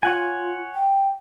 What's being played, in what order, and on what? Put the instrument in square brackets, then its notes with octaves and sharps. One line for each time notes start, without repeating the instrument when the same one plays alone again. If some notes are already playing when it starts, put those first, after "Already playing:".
[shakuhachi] F4 [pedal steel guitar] C#5 F#5 G#5
[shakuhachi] G5